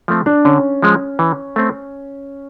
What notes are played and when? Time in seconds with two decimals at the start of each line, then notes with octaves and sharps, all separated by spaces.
0.08 F3 A3 C4
0.26 D4
0.45 D3 C#4
0.82 F3 G#3
1.19 E3
1.56 A3 C4